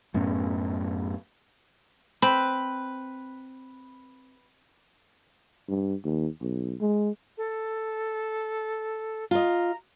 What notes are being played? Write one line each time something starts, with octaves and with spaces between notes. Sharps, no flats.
F#2 A2 B3 C#4
C4 B4
G2
D#2
B1
G#3
A4
F4 D#5 A#5